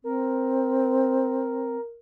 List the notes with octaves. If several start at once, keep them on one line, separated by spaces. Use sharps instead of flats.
C4 A#4